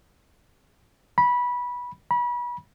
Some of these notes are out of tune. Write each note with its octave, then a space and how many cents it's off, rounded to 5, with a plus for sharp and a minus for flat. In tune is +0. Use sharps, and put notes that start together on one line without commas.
B5 -15
B5 -30